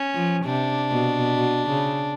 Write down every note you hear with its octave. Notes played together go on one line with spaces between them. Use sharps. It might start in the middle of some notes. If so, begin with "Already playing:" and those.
Already playing: C#4
F3
C3 D4
B2
B2
C#3